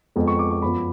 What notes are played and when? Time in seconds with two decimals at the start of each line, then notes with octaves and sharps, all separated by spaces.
0.16 F2 F3 G#3 B3
0.27 C#6
0.39 D6
0.51 C#6
0.62 F#2 F3 B3 B5